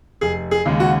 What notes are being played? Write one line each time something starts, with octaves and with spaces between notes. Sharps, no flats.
F1 G#4
G#4
D#2 C#3 G#3
F#4